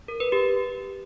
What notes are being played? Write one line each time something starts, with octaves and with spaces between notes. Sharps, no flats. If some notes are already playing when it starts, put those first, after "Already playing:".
A#4
B4
G4